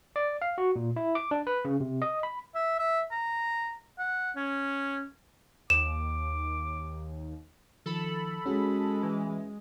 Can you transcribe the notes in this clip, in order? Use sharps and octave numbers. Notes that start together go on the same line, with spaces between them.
D5
F5
F#4
A#2
E4
D6
D4
B4
C#3
C3
D#5
B5
E5
E5
A#5
F#5
C#4
D#2 D6 E7
D#3 F3 A4 B5
G#3 C#4 F#4 G#4
E3